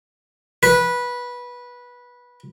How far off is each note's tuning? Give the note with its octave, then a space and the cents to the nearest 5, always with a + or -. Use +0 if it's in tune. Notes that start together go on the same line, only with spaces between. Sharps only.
B4 -15